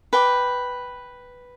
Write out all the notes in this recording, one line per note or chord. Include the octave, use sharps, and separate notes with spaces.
B4 G5 D6